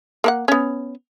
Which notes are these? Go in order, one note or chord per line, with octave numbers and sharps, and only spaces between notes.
A#3 A#4 F#5
B3 C#4